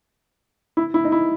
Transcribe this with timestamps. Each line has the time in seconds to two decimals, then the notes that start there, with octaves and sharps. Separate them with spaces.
0.77 E4
0.94 E4
1.05 D#4
1.12 E4